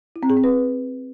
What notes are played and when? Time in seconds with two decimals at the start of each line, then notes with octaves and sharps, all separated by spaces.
0.16 E4
0.23 C4
0.30 G#4
0.37 C4
0.44 B4